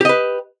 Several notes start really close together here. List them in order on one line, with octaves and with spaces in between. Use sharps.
G4 D#5 B4